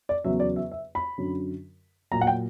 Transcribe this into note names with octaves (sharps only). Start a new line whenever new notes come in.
D5
E2 C#3 F#3 E5
D5
E5
E5
B5
F#2 D3 F#3
A#2 F#3 A#5
F#5
G5